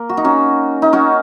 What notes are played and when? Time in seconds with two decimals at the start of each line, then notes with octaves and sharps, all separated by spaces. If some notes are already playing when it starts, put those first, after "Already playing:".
Already playing: A#3
0.09 F#4
0.17 D#4
0.24 C#4 F#4
0.82 D#4
0.93 C#4 F#4